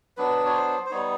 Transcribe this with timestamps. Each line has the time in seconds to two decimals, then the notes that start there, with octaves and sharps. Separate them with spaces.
0.17 F#3 B3 D4 B4
0.46 C#5
0.54 C5
0.86 C5
0.91 G3 B3 D#4 C#5